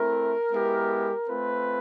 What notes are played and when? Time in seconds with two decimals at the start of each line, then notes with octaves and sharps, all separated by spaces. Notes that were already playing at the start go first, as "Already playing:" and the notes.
Already playing: A3 C4 E4 A#4
0.51 G#3 B3 E4 G4
1.29 A3 C4 F4 B4